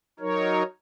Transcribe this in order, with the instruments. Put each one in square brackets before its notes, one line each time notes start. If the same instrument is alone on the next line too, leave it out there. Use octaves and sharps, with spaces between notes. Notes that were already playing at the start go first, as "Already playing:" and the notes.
[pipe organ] F#3 D#4 A#4 C#5